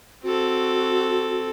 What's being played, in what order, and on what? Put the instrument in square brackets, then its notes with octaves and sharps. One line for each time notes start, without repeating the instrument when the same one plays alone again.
[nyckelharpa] C4 A4 [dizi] F#4